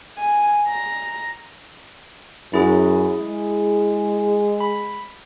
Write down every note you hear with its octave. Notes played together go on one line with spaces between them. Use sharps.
G#5
A#5
F#2 E4 G#4
G#3
B5